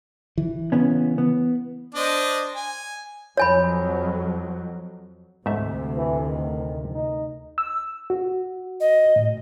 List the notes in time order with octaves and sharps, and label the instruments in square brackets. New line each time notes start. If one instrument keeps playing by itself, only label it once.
[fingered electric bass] E3
[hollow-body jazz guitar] C#3 B3 C#4
B3
[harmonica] D4 C5 D#5
G#5
[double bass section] F2 F#3 [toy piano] C#5 G#5 B5
[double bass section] D2 C3 [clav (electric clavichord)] G#2 A3 E5
[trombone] E3
D#3
D#4
[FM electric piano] E6
[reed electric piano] F#4
[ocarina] D#5
[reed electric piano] A2